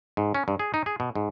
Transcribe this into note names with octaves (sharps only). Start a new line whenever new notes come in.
G#2
C#4
G2
G#4
D#4
G#4
B2
G#2